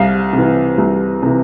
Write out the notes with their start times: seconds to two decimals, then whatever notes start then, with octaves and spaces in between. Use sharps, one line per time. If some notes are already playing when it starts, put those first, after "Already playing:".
Already playing: C2 F5
0.33 C3
0.38 E3
0.78 C2
1.23 C3 E3